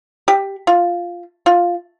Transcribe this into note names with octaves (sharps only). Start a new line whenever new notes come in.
G4
F4
F4